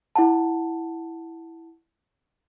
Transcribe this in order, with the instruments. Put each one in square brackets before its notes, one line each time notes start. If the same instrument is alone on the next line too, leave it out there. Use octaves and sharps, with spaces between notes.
[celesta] E4 F#5 A5